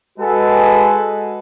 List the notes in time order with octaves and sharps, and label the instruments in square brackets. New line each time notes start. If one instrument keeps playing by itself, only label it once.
[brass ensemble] G#3 F#4 A4 B4